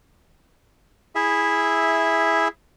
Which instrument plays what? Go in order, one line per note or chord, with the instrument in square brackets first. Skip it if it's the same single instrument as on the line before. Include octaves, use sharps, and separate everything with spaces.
[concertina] E4 G#4 E5